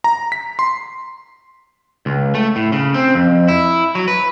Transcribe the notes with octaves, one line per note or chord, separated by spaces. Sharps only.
A#5
B6
C6
C#2
A3
A2
C#3
C4
F2
E4
F#3
B4